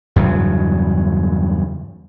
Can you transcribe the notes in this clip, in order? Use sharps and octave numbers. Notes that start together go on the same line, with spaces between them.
E2 G2 C#3 F#3